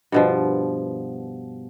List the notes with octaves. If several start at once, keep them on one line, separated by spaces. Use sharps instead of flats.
G2 B2 F3